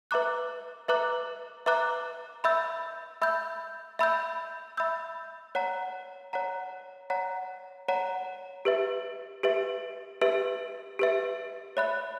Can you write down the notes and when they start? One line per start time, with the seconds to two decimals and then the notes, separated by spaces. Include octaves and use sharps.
0.11 B4 E5 A#5 D6 F#6
0.88 B4 E5 A#5 D6 F#6
1.66 B4 E5 A#5 D6 F#6
2.44 E5 B5 E6 G6
3.22 E5 B5 E6 G6
3.99 E5 B5 E6 G6
4.77 E5 B5 E6 G6
5.55 C#5 F#5 A#5
6.33 C#5 F#5 A#5
7.10 C#5 F#5 A#5
7.88 C#5 F#5 A#5
8.65 G4 B4 E5
9.43 G4 B4 E5
10.21 G4 B4 E5
10.99 G4 B4 E5
11.77 C#5 E5 B5 F#6